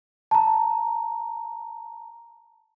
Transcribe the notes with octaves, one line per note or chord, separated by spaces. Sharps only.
A5 A#5